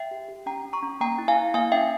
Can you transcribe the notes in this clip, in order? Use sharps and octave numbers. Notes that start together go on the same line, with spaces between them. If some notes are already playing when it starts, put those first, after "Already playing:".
Already playing: E5 G5
G4
G4
C#4 G5 A#5
C#4
A#5 C#6
C#4
A#3 G5 A#5
E4
F5 G#5
E4
A#3 F5 G#5
C#4 E5 G5